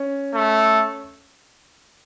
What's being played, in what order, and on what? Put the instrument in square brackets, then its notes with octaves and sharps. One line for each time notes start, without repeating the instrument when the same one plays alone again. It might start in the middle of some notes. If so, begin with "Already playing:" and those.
Already playing: [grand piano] C#4
[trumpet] A3